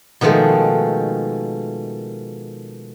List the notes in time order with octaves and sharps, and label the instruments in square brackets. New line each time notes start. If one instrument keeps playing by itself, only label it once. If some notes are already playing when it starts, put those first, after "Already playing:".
[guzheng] B2 D#3 F3 G#3 A3